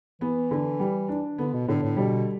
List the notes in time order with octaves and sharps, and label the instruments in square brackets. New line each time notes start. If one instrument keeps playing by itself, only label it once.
[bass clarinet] E3 [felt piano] B3
[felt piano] D3
G3
D4
[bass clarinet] D3 [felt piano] B3
[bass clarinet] B2
[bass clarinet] A2 [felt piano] D3
[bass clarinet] A2
[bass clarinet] B2 [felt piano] G3